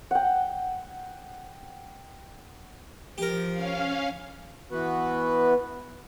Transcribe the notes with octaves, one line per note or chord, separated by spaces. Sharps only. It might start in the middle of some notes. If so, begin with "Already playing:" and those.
F#5 G5
F3 G4 A#4
C#4 F5
E3 B3 F#4 B4